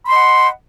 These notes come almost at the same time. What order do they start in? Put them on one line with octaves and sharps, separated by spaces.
B5 C6 D#5 F#5